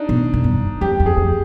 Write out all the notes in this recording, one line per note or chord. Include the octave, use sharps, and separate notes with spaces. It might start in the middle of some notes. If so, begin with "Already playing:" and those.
Already playing: D4 D#4
B2
F#2
G2
F2 G4
F2
G#4
F2